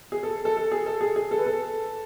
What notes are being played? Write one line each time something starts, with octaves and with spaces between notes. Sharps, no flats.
G#4
A4
A4
A4
G#4
A4
G#4
G#4
A4
B4
A4